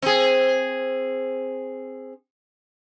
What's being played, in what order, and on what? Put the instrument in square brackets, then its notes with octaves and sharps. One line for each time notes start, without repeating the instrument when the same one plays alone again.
[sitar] C4 G#4